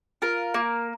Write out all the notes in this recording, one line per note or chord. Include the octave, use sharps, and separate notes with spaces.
F4 A#4
A#3